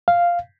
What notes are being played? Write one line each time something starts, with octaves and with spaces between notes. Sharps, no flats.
F5